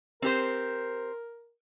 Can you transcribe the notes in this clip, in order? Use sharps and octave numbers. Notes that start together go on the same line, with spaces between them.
C4 G4 A#4 C5